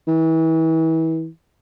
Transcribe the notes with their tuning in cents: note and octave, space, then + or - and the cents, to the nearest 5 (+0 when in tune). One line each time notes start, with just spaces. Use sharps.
E3 -30